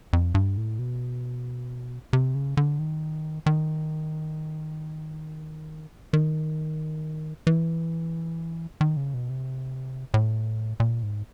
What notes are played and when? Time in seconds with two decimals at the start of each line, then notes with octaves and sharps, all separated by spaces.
0.13 F2
0.35 G2
0.57 A2
0.79 B2
2.13 C3
2.35 C#3
2.57 D3
2.79 D#3
3.46 D#3
6.13 D#3
7.47 E3
8.81 D#3
8.97 C#3
9.14 B2
9.30 C3
10.14 A2
10.80 A#2
11.03 G#2